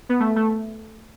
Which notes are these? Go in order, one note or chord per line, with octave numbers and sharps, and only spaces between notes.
B3
A3
A3